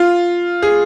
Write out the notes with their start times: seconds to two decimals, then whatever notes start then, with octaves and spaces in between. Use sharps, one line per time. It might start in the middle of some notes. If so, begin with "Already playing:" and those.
Already playing: F4
0.62 G#4